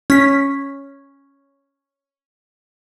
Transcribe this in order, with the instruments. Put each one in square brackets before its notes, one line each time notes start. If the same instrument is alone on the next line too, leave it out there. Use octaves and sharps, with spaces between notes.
[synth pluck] C#4 B6